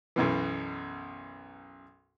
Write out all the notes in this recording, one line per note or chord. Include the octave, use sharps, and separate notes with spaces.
B1 F#2 B2 E3